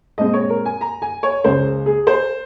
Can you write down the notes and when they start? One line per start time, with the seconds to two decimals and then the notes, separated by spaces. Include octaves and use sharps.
0.18 A#2 G#3 C4 D#5
0.34 C#5
0.50 A#4
0.65 G#5
0.81 A#5
1.02 G#5
1.23 C#5
1.44 C#2 C#3 G#3 C#4 C5
1.86 G#4
2.07 C5